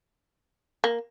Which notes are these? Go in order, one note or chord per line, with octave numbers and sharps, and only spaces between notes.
A#3